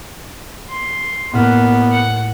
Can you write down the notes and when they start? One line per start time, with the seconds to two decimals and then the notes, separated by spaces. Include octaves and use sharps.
0.70 C6
1.33 A2 A#3 B3 F6 F#6
1.91 F#5